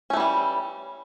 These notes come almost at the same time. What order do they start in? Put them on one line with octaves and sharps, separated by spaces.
C#4 A3 E3 G3